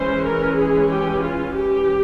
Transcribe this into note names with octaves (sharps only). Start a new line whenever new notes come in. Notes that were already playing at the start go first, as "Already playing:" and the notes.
Already playing: E3 G#3 C#4 C5
A#4
G#4
G4
F4
G4